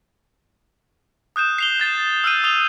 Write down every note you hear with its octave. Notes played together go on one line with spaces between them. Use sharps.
D#6 F#6 G6 E7
C7 F7 G7
G6 A6 C7 E7
E6 F6 G6 D#7
D#6 F7 G7